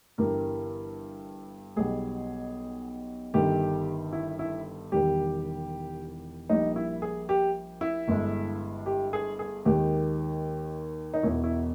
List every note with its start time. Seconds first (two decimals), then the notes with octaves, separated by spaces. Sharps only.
0.18 G1 G2 E3 G3 A#4
1.76 B1 B2 G3 G#4
3.34 G1 G2 D#3 G3 G4
4.13 E4
4.39 E4
4.92 E1 E2 D#3 G3 G4
6.49 A#1 A#2 G3 D#4
6.76 E4
7.02 G#4
7.29 G4
7.81 E4
8.08 G1 G2 E3 G#3
8.86 G4
9.13 G#4
9.39 G#4
9.65 D#2 D#3 G#3 G4
11.14 D#4
11.23 E1 E2 B2 E4
11.44 E4